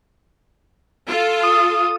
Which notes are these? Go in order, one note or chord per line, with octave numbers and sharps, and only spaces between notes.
F4 A4
D#6